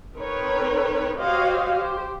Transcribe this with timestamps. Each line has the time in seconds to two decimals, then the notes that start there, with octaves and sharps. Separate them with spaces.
0.16 C4 D#4 A#4 B4 C#5
1.19 F#4 G4 C5 C#5 D#5 F5
1.73 G4 C5